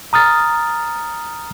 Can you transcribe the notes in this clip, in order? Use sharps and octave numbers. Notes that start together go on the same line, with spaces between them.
A#5 D#6 F6 A6